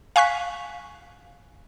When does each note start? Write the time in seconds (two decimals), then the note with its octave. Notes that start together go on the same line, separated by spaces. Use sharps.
0.16 F5 G#5 C#6 F#6 B6